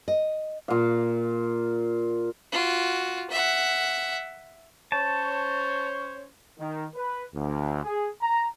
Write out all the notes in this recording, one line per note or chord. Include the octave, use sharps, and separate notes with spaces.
D#5
A#2 F5
F4 F#4
E5 F#5
C#4 C5 C#5 A5
D#3
B4
D2
G#4
A#5